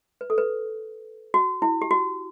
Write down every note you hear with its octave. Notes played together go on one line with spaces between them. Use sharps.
B4
A4
B4
F#4
E4
G4
F#4